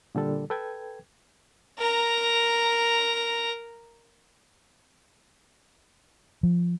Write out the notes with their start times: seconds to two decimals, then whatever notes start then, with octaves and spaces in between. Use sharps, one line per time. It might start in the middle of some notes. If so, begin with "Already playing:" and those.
0.15 A#2 D3 G3 A4
0.50 A4 B4 G5 G#6
1.78 A#4 A#5
6.43 F3